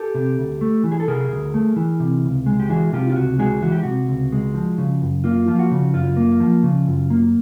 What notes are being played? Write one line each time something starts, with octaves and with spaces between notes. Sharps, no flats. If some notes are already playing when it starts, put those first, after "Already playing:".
Already playing: G4 A4
C3
D2
A3
E3
G#4
A4
C3 G#4 A#4
D2
A3
E3
C3
C#2
G#3
G4
E3 F#4 G#4
C3 F4 G4
F4
C#2 F#4
G#3 F#4 G#4
E3 F#4
G4
C3 F#4
C#2
G#3
F3
C#3
F#2
A#3 F4
F3 F4
F#4
C#3
F#2 F4
A#3
F3
C#3
F#2
A#3